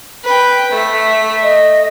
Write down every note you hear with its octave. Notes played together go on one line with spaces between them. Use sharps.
B4 G5
A3 E5
D#5